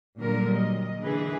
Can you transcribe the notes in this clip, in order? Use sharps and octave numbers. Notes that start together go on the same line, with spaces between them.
A#2 D3 F#3 G3 A#3 A#4
D#5
D3 E3 G#4 B4